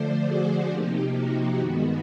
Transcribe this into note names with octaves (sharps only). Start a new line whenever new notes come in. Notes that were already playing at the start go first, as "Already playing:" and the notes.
Already playing: D3 F3 A3 C5 D5
F#4 G#4
C3 F3 A#3 D#4 G4
F#4
G2 D#3 G#3 B3